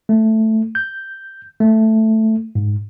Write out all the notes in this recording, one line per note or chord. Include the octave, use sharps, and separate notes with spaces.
A3
G6
A3
G#2